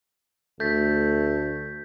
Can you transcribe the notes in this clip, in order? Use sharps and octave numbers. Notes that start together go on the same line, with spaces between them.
D2 A3 G6 A6 B6